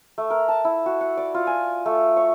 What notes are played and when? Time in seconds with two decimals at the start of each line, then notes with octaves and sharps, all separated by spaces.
0.18 A3
0.30 A#4
0.48 A5
0.65 E4
0.86 F#4
1.01 F#5
1.17 D5
1.34 F4
1.47 G#5
1.86 A3
2.17 C#5